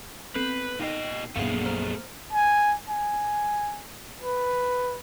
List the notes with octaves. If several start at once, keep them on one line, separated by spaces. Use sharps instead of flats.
B3 C4 A4 B4
A#2 D#4 A4 D#5 G5 C7
A#1 F#2 A3 B3 G#4 F5 F#5
C5 A#5 F6
G#5
G#5
B4